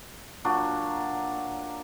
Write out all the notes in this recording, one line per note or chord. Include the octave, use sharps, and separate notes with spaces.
A#2 F#3 D4